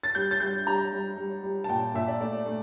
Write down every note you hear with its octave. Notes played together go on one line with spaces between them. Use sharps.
A6
G3 G6
A6
G3 G6
G3 A#5
G3
G3
G3
A5
A#2 G5
A#2 E5
D5
A3 D5
A3